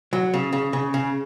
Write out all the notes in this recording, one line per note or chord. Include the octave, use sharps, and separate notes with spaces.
F#3
C#3
C#3
C#3
C#3